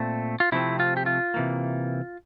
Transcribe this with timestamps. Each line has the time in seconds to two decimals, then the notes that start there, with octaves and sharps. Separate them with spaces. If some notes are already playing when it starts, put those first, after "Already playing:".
Already playing: A#2 A3 C4
0.40 F4
0.52 C3 F3 A3 C4 E4
0.80 F4
0.97 G4
1.06 F4
1.34 C3 E3 A#3